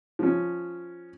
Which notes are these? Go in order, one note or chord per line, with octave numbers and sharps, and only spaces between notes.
F3 C#4